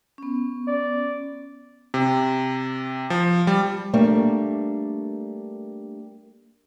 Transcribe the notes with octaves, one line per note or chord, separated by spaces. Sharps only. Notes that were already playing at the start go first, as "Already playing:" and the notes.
B3 C#4
D5
C3
F3
G3
G3 A3 A#3 D4